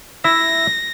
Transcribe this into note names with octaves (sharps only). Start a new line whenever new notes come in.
E4 E5 A#6